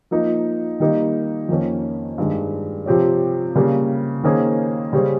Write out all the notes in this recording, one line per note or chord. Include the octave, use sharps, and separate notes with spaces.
F3 A#3 D#4
D#3 G3 A#3 D#4
F2 D#3 A#3 C#4
G2 D#3 G#3
C3 F3 C4 G4 C#5
C#3 G3 A#3
D#3 A#3 C#4 G#4 C5
C#3 G3 C#4 G#4 C5